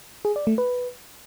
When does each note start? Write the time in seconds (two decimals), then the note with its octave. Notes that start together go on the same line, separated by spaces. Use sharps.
0.25 G#4
0.36 D5
0.47 A3
0.58 B4